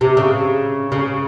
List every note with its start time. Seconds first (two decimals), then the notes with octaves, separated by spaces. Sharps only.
0.01 C3
0.17 C#3
0.92 C#3